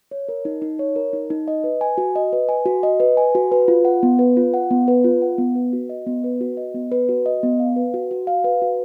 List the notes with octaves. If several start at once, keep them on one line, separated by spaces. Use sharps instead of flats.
C#5
A#4
D#4
D#4
C#5
A#4
D#4
D#4
D#5
B4
G#5
F#4
D#5
B4
G#5
F#4
D#5
B4
G#5
F#4
B4
F4
F#5
B3
B4
F4
F#5
B3
B4
F4
F#5
B3
B4
F#4
D#5
B3
B4
F#4
D#5
B3
B4
F#4
D#5
B3
F5
B4
F#4
F#4
F5
B4
F#4